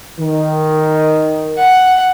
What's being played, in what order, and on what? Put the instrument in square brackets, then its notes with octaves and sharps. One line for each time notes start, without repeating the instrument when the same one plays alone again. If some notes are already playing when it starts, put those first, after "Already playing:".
[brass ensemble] D#3
[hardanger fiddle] F#5